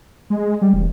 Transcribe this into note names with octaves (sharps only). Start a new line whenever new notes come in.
G#3
G3
E1